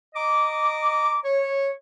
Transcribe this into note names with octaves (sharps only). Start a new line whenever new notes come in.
D#5 A#5 D6
C#5